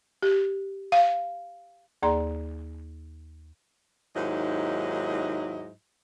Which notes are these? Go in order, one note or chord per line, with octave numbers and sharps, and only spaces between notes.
G4
F5
D#2 A#3 G#4 D5 A#5 C6
D#2 G#2 F#3 E4 D#5